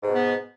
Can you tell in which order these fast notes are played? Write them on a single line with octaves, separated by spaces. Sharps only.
G#2 B2 B3